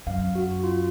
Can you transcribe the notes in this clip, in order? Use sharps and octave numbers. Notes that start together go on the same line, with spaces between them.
F#2 F5
F#4
F4